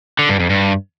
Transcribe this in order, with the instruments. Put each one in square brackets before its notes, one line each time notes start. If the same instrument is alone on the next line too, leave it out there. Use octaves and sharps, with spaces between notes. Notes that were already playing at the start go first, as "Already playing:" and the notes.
[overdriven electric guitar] D3
G2
F2
G2